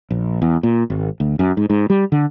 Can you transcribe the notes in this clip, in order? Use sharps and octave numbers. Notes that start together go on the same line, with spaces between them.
A#1
E2
A#2
G#1
D2
F#2
G#2
G#2
G3
D3